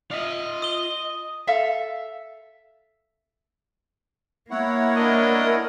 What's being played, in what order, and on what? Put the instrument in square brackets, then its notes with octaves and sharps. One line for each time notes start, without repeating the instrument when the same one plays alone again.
[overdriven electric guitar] F4 E5 [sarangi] D#5
[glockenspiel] D#6 G7
[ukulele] A4 E5 F5
[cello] A#3 [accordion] E4 C#5 F#5
[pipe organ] D4 D#5 [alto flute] A#4